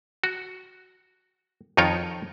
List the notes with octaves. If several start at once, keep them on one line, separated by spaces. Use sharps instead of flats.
F#4
F2 D#3 D#4 F4 C#5 G5